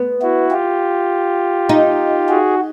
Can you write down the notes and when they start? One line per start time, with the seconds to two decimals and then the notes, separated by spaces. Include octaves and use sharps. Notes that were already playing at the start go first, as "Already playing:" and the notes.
Already playing: B3
0.22 E4 F#4
0.51 F4 G4
1.69 D#4
2.29 F#4 G#4